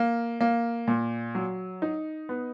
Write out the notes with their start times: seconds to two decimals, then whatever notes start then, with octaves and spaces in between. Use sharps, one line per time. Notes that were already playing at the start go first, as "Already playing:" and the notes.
Already playing: A#3
0.41 A#3
0.88 A#2
1.35 F#3
1.82 D#4
2.29 B3